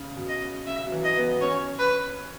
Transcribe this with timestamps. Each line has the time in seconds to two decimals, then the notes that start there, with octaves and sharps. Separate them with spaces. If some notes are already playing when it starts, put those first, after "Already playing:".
Already playing: C#3
0.16 B2
0.28 D#5
0.42 C#3
0.67 C#3 E5
0.86 F#3
0.92 E3
1.04 D#5
1.17 B3
1.41 C#4 C#5
1.79 B4